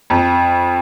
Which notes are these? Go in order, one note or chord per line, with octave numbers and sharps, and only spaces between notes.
F2